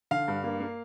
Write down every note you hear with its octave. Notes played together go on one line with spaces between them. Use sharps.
D3 F5
G2
A#3
A#3